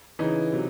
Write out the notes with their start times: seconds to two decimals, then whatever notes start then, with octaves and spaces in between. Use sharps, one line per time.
0.19 C#3 E3 D#4
0.52 C3 F#3